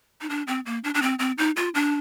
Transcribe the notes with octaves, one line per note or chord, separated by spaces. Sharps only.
D#4
D4
C4
A#3
D4
D4
C4
C4
D#4
F4
D4